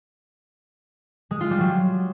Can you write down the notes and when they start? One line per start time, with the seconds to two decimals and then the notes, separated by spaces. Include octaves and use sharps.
1.31 G#3
1.41 F4
1.50 G3
1.60 F#3